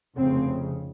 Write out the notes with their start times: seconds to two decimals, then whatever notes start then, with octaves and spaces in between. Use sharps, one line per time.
0.16 F1 F2 C#3 C4